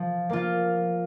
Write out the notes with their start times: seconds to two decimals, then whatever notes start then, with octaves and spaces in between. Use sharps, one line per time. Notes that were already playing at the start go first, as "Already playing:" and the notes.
Already playing: F3
0.29 A#3 F4